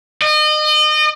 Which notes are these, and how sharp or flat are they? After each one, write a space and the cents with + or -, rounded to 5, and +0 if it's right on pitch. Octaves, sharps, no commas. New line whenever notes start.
D#5 -35